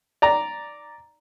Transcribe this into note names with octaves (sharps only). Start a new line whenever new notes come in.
D5 A#5